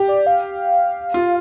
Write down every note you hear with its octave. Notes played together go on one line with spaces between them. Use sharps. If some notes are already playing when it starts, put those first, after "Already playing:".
Already playing: G4
D5
F5
F4